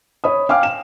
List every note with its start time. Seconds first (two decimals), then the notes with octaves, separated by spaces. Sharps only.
0.24 C#5 B5 D#6
0.49 F5 G5 G#5 D6 F6
0.63 E7